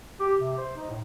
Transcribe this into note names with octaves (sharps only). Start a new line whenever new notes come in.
G4
C3
C5
D#4
A2